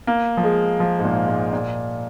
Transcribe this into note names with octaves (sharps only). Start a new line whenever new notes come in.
A#3
F3
G#3
F3
G#2
A#2
G#2
A#2